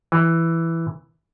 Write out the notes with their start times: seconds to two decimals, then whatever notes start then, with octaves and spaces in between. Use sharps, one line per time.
0.12 E3